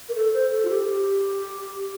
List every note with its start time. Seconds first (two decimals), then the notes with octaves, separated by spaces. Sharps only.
0.09 A#4
0.15 A4
0.33 C5
0.52 A4
0.65 F4
0.70 G4